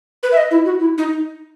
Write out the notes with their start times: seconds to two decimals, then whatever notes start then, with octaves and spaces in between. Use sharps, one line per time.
0.23 B4
0.32 E5
0.37 D#5
0.51 E4
0.65 F#4
0.80 E4
0.98 D#4